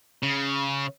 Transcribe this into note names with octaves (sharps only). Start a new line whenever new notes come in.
C#3